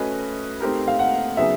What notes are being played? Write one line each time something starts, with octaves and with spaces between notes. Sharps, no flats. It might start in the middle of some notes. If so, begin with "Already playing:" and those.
Already playing: A3 C#4 F#4 B4 D#5
A3 C4 D#4 G4 A#4
F5
F#5
C#3 F#3 B3 D#4 G#4 E5